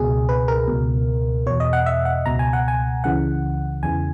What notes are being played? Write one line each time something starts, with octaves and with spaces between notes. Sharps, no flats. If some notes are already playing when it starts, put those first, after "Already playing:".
Already playing: C#2 B2 G#4
B4
A#4
C#2 B2
E2 B2 C#5
D#5
F#5
E5
F#5
C#2 B2 A#5
G#5
F#5
G#5
C#2 C#3 E3 F#5
E2 C#3 E3 G#5